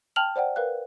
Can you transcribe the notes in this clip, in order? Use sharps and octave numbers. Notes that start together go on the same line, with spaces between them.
G5 A5 F6 F7 F#7
C5 D5 F#5 G5
A#4 B4 F5 F#6